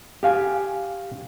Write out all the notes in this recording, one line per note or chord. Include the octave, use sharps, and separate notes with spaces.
G4 F5 G#5